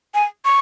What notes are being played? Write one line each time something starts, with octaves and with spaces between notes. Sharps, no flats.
G#5
C#6